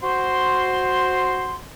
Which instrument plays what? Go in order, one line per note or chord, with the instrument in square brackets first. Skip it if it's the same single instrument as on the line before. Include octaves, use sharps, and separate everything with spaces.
[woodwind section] F#4 C5 C6